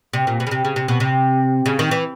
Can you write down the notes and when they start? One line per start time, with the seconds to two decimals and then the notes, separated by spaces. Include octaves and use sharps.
0.13 C3
0.27 A#2
0.40 B2
0.47 C#3
0.51 C3
0.65 C#3
0.76 C3
0.88 B2
1.00 C3
1.66 C#3
1.79 D#3
1.91 E3